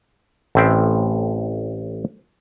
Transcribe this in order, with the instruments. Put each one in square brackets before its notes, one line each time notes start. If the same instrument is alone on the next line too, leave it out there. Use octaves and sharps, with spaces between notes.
[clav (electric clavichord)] A1 A2 C4 E5 G5